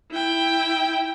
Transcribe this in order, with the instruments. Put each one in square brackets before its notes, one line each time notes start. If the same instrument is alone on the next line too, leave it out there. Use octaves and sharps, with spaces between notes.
[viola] E4 G5